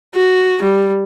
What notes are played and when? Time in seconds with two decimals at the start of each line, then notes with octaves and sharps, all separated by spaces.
0.15 F#4
0.62 G3